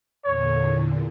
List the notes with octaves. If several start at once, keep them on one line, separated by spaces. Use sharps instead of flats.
E2 A#2 D3 C#5